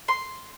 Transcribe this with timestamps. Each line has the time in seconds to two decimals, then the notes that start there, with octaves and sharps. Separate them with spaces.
0.08 C6